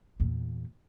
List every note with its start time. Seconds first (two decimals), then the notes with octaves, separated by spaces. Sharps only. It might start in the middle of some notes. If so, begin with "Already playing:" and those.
0.20 E2 A#2